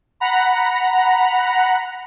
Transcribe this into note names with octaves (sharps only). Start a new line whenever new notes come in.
F#5 A#5 B5